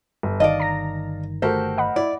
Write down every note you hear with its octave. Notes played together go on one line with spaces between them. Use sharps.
G1
G1 D#3 D5 D#5 F5 A5
A#5 A#6
A3 F#4 G4 A4 A#4 C5
D#5 F#5 B5
E4 D5